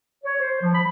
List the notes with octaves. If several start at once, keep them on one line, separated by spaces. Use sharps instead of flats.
C#5
C5
F3
B5